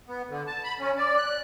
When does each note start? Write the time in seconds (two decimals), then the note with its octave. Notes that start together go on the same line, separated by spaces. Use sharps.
0.08 B3
0.30 D3
0.47 A5
0.64 B5
0.80 C#4
0.98 D5
1.17 F#6